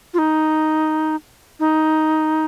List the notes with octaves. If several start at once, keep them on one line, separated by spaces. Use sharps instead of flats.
F4
D#4
D#4